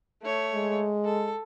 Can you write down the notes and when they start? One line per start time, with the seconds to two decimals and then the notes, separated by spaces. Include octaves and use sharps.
0.23 A3 C#5
0.54 G#3
1.05 A4